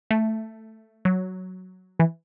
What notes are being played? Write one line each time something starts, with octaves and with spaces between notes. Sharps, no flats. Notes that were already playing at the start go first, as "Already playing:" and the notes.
A3
F#3
E3